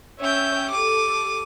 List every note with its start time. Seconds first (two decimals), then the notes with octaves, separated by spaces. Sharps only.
0.20 C#4 C#5 E5 G5 G6
0.71 G4 A4 D6 D#7